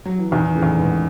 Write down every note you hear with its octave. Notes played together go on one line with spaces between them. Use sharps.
F#3
E3
E2 B2 D#3
A2 C#3
E2
G#2 B2